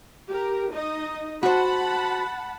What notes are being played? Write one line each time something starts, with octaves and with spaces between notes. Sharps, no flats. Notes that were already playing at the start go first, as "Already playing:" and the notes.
G4 A#4
D#4 D#5
F#4 C5 F#5 A5 B5